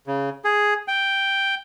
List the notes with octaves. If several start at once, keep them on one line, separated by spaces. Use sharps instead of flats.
C#3
G#4
G5